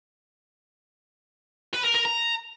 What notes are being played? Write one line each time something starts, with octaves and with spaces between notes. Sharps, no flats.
B4
A#4
A#4
A#5